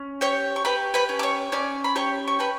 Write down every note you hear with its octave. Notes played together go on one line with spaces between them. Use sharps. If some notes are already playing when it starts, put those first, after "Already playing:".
Already playing: C#4
G4 C#5 C#6
C#6
G4 B4 B5
B4 B5
C#4
D6
C#5 C#6
C#4 D5 D6
B5
G4 C#5 C#6
C#6
G4 B4 B5